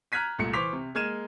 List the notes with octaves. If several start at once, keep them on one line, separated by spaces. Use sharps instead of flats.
A#5 F6 F#6 G#6 B6 D#7
C2 A#2 A3 C#7
E3 C5 C#6 D6 B6 F7
C3
G#3 A#3 F6 G#6 D#7 E7